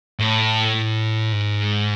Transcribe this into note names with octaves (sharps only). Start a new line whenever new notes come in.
A2
G#2